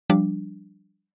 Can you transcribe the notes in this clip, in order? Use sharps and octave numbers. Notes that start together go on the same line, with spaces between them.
F3 G3 D4